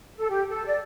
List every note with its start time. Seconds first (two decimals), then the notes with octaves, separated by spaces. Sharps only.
0.16 A4
0.30 G4
0.48 A4
0.66 D5